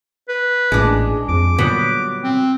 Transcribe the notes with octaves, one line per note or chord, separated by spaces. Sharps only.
B4
A1 A#2 G#3 D4
F2 D6
A#2 D3 F#3 G3 B3
C4